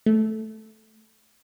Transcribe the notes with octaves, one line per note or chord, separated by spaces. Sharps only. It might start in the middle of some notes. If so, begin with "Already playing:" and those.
A3